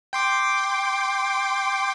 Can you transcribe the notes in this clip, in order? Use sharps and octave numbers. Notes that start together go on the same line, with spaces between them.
G5 C6 D6